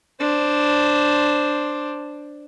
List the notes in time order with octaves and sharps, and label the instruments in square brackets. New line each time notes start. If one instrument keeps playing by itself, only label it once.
[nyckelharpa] D4 C5